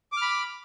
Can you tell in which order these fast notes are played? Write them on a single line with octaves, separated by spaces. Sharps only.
D6 F6 B5